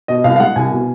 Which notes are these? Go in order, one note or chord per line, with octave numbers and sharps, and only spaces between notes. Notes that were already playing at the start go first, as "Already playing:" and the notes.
B2 D#5
C2 F5
F5
G#3 F#5
C2 G#5
B2